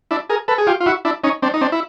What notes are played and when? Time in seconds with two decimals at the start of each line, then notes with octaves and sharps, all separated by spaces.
0.11 D4 E4
0.29 G#4 A#4
0.48 A4 B4
0.58 G#4
0.67 F4 G4
0.80 F4
0.86 E4 F#4
1.05 D4 E4
1.24 C#4 D#4
1.42 C4 D4
1.54 D#4
1.61 C4 D4
1.72 E4